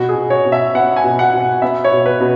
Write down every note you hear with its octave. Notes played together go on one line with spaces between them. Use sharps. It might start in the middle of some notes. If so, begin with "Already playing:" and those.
Already playing: B2 F#4
G#4
B2
C#5
B2
E5
B3 F#5
G#5
B2
F#5
B2
F#5
B3 E5
C#5
B2
B4
B2